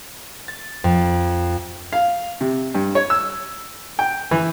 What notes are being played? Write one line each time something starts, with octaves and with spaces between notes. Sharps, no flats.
A6
F2
F5
C3
G2
C#5
E6
G5
E3